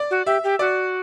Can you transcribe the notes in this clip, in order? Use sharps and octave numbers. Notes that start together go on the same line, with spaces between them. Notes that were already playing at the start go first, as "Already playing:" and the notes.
Already playing: D5
F#4
G4 E5
G4
F#4 D5